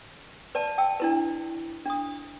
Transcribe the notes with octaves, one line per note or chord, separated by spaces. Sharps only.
B4 D5 A5
G5 A5 E6
D4 E4 B4
D4 D#6